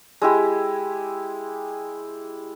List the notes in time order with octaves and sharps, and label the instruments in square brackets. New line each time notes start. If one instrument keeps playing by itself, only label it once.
[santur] G#3 E4 G4